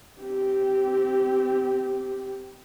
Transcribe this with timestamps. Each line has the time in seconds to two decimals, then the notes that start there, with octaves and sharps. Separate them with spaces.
0.21 C4 G4